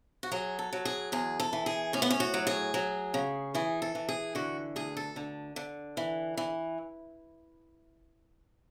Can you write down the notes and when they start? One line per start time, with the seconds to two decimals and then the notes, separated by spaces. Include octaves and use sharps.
0.23 F#4
0.32 F#3 G#4
0.59 A4
0.73 F#3
0.85 G#4
1.12 E2 G#4
1.40 A4
1.53 E3
1.66 G#4
1.93 A2 C#4
2.02 B3
2.10 C#4
2.20 F#4
2.34 F#3
2.47 G#4
2.74 F#3
3.14 C#3
3.55 E3 G#4
3.82 A4
3.95 E3
4.09 G#4
4.35 D3 F#4
4.76 D2 G#4
4.97 A4
5.16 D3
5.56 D3
5.97 E3
6.37 E3